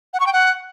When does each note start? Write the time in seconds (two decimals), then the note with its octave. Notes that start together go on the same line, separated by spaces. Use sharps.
0.14 F#5
0.20 C#6
0.27 G5
0.33 F#5